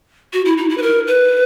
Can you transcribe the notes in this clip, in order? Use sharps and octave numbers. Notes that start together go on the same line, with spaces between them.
F#4
E4
D#4
E4
B4
A#4
B4